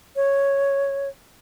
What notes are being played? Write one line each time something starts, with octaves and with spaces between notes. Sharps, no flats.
C#5